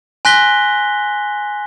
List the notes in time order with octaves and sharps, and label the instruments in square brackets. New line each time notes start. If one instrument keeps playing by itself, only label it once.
[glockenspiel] G#5 C6 F#6 A#6 B6 G7